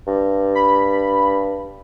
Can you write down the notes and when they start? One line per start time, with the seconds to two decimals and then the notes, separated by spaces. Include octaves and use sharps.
0.07 G2
0.55 B5